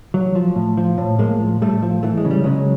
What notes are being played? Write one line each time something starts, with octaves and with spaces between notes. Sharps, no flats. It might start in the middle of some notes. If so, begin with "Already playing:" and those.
F#3
F3
A2
F3
A2
A2 G#3 A#3
F3
A2 G3 A3
F3
E3 A3
G#3
C#3
G3
C#3 F#3 G#3